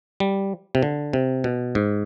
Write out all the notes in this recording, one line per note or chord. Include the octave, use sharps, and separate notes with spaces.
G3
C3
D3
C3
B2
G#2